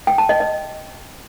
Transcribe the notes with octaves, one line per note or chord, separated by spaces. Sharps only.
G5
A5
D#5
D#5